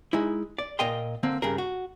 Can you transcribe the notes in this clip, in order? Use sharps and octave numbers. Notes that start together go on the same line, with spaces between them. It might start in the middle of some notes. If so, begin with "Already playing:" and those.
G#3 D#4 E4
D5
A#2 A#4 D#5 G5 C6
D3 A#3 C4
G2 C#3 G#4 A#4
F#4